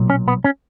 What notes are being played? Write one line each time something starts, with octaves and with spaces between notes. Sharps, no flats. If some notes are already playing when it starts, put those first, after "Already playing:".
Already playing: B1 A#2 F#3
C#4
B3
C#4